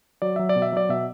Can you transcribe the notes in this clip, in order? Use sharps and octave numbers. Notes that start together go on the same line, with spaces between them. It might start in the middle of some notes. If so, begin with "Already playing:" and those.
F#3 D5
F#3 E5
D5
B2
E5
F#3 D5
B2 E5